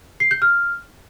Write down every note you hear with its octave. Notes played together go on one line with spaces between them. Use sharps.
C7
G6
F6